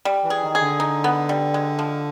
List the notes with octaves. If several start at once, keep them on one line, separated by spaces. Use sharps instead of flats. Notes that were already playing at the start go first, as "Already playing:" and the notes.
G3
E3
G#4
D#3
G#4
D3
D#4
B3
G3
G#3
F3